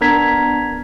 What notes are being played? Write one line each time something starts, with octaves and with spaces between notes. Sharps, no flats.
B3 D4 A#4 A#5 G#6 B6